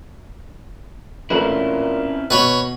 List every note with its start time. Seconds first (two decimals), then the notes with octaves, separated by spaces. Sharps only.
1.30 A1 A#2 A3 C4 C#4 E4 B4
2.30 B2 B4 C#5 B5